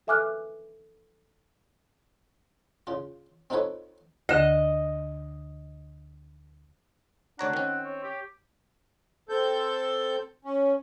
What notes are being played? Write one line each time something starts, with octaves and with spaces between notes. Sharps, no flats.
A4 E5 G#5 D6 F6 F#6
C#3 F4
C4 D#4 F4 A4 B4 C#5
D2 D3 D#5
D2 D4 C#5 F#5 A#5
D#3 C4 C#4
C#5
G4
C4 A4 G6
C#4